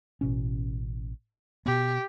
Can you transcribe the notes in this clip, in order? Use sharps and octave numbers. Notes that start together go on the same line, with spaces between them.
A1 B2 C#4
B2 B3 G4